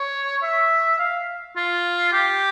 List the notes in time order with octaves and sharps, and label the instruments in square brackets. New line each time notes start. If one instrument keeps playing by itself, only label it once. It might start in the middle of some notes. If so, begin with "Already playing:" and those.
Already playing: [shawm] C#5
E5
F5
F4
G4